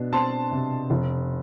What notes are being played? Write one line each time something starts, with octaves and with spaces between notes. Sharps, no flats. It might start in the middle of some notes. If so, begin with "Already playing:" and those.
Already playing: B2 D4
C4 A5 C6
C3
F1